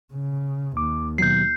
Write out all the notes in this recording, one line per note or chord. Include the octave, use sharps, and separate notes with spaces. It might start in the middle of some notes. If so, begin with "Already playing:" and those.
C#3
D#2 D6
B2 D#3 F#3 G6 C7